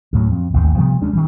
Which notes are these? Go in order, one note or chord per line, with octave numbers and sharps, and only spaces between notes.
D2 A2 F#3
F2
A1 D#2 G#2
C3 F3 G3 B3
D2 G#3 C#4 D4
D#3 F#3 G3